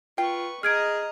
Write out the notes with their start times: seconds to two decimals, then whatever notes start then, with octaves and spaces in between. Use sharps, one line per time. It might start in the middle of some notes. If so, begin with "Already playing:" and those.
0.18 F4 B4 G5 C#6
0.63 G#4 D#5 A#5 F6 G#6 D7